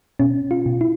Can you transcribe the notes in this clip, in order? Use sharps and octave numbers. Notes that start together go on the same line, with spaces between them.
B2 C#4
F4
B2
E4